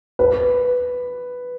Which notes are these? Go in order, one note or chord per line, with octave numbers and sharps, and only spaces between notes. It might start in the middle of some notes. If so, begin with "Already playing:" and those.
B4